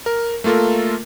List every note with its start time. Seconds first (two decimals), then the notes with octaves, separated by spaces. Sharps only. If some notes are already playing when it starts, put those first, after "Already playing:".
0.06 A#4
0.44 A3 A#3 F4 A4 A#4